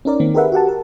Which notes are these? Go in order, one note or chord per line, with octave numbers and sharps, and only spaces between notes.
C#4 D#4 A#4 D5
D#3 A#3 C4
G4 G#4 A#4 B4 E5 F#5
F#4 G4 F#5 A5
A#4